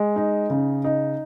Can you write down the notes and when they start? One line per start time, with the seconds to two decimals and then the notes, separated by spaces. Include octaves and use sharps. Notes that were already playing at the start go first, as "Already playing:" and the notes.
Already playing: G#3
0.16 D#4
0.50 C#3
0.84 D#4